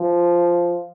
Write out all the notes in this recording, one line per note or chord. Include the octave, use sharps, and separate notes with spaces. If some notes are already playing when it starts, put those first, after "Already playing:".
Already playing: F3